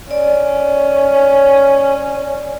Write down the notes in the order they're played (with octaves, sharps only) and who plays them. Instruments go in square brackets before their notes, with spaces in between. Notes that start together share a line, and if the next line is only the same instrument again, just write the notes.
[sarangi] C#4 [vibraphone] D5